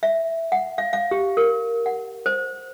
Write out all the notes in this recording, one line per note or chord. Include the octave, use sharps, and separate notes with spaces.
E5
F#5
F5
F5
G4
A#4
F#5
C5